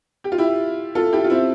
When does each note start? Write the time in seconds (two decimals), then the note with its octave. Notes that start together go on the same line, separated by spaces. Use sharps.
0.24 G4
0.32 F4
0.38 E4 G4
0.95 F4 A4
1.12 E4 G4
1.24 F4
1.30 C4 E4